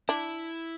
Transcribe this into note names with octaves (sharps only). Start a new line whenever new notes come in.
D4 E4